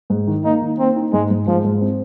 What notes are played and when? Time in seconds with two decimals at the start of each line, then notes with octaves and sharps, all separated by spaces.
0.10 G#2
0.27 D#3
0.44 A#3 D#4
0.62 D#3
0.79 A#3 C4
0.96 D#4
1.13 G#2 G#3
1.31 G#2
1.47 G#2 F3
1.64 G#2
1.81 C4